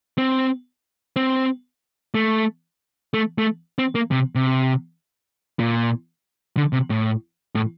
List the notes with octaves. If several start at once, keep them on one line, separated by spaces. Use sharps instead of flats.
C4
C4
A3
A3
A3
C4
A#3
C3
C3
A#2
D3
C3
A2
A2